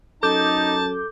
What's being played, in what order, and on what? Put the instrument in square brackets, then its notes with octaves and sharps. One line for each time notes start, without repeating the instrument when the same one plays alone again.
[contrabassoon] F#2 [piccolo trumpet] D#4 [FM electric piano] A4 D6 G6 [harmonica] A5